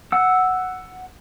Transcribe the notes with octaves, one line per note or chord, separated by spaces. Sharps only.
F#5 E6